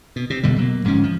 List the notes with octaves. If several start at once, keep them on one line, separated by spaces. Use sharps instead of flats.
B2
C3
E1 B2 D3 G3
B2 F#3 A#3
D1 G#2 F3 C#4
F3